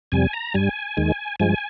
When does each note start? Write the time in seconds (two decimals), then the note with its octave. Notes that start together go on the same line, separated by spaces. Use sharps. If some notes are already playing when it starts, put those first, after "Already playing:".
0.12 F2 C3 G3 G#5
0.33 A#5
0.54 G2 G3 G#5
0.97 D#2 D#3 G#3
1.40 G2 F3 G#3 G#5